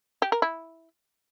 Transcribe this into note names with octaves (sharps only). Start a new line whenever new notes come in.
G4
A#4
E4